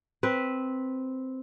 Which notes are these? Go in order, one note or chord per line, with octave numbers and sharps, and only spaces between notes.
C4 B4